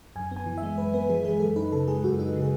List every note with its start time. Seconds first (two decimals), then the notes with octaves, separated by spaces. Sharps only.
0.16 F#2 G#5
0.31 B3
0.36 G#5
0.46 E3
0.58 E5
0.63 G#3
0.78 F#2 B4
0.94 B3 B4
1.10 E3 G#4
1.25 G#3 G#4
1.40 F#2 A4
1.56 D#4 B4
1.72 C#3 A4
1.88 G#3 G#4
2.03 F#2 F#4
2.19 D#4 F#4
2.35 C#3
2.41 G#4